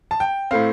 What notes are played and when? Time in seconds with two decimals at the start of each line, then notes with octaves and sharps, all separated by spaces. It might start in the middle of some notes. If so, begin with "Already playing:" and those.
0.11 A5
0.20 G5
0.51 A2 A3 C4 F5